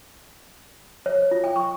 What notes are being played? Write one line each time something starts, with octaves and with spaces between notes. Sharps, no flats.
C#5
F4
G5
C#6